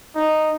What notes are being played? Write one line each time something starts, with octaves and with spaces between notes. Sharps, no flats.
D#4